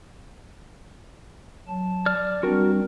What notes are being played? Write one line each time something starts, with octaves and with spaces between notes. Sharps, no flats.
F#3 A5
D5 F6
G3 C4 D4 F#4 A#4